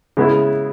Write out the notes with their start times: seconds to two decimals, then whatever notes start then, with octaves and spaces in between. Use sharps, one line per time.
0.17 C#3 G#3 B3 E4